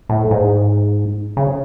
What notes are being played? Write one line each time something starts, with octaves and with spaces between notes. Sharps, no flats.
A2
G#2
C#3